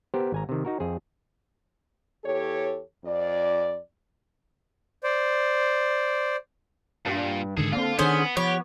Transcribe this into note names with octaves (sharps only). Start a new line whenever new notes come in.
B3 G4 A#4 C5
G#1 G#5 A#5
C3 D#3
D#4 F#4 A#4
F2 G#4 C5
E2 G4 A4 C#5
F2 D5
C5 D5
G2 A#2
G#2 D3 D#3 G#4 A4
D3 A#3 C4 F4
D#3 B3 C#4 D4 G#4 C5
F3 B3 G4 C#5